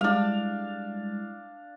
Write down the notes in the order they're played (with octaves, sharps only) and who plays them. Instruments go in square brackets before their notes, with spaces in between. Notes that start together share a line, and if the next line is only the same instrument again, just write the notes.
[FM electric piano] G3 G#3 E4 [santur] D4 F5